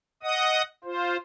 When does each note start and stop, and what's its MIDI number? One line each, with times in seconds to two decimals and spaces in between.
0.23 0.62 75
0.23 0.62 78
0.23 0.62 87
0.84 1.17 65
0.84 1.17 72